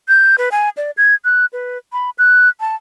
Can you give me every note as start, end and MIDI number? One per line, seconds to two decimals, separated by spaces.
0.08 0.36 91
0.38 0.49 71
0.52 0.69 80
0.77 0.91 74
0.97 1.14 92
1.25 1.46 90
1.53 1.78 71
1.93 2.10 83
2.18 2.49 90
2.60 2.76 81